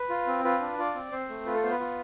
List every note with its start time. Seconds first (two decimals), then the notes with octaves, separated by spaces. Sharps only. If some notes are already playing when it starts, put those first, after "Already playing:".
Already playing: B4
0.10 F4
0.27 C4
0.44 F4 B4
0.61 D4
0.78 F4 D5
0.95 C4
1.12 C4 C5
1.29 A3
1.46 F4 B4
1.54 A4
1.63 B3 C5
1.72 B4
1.80 F4